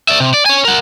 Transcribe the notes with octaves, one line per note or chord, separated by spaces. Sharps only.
D5 E5
C3
D5
C#5 G#5
A#4 F#5